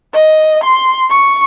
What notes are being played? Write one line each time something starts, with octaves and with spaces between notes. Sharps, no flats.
D#5
C6
C#6